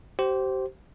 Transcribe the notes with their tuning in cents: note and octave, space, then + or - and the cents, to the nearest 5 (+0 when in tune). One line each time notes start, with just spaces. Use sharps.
G4 -30 C5 +0